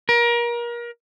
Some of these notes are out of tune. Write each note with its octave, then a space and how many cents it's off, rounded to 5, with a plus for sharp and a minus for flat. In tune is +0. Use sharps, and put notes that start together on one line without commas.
A#4 +30